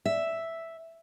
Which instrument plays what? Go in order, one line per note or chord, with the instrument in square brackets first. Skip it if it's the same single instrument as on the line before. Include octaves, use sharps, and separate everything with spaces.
[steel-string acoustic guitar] E5